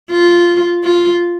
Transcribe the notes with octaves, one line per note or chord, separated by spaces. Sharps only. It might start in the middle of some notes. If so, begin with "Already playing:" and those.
F4
F4